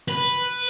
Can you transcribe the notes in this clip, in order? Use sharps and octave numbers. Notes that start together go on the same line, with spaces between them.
B4